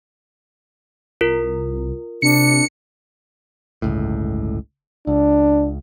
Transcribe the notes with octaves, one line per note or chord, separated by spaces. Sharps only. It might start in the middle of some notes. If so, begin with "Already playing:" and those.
C2 F4 A#4
C3 D4 C#7
G1 C#2 A2
C#2 D4